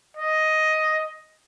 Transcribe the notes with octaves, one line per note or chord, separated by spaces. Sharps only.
D#5